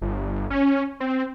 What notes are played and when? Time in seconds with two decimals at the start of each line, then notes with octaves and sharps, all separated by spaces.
0.02 G1
0.50 C#4
1.00 C4